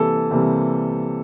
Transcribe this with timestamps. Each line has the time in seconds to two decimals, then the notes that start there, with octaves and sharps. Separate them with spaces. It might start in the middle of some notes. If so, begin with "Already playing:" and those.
Already playing: C3 E3 G3 A#3 A4
0.31 C3 E3 G3 A#3